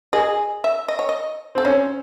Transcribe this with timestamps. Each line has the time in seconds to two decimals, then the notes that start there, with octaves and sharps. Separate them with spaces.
0.13 G#4 D#5
0.64 E5
0.88 D#5
0.99 C#5
1.09 D#5
1.55 C4 A4
1.65 C#4 C5